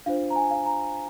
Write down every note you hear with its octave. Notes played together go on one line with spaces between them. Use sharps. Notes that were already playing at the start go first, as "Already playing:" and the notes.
D4 F4 C5 F5
A#5
G#5
F5
A#5